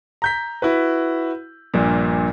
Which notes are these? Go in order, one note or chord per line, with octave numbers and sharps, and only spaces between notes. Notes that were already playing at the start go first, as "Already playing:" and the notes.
A#5 G6 B6
E4 F#4 B4
A#1 G2 A#2